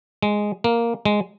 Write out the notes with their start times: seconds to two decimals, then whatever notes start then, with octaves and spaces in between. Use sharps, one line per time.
0.23 G#3
0.64 A#3
1.05 G#3